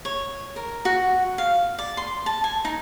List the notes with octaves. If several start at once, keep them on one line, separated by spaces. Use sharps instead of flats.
C#5
A#4
F#4
F5
D5
C6
A5
G#5
D#4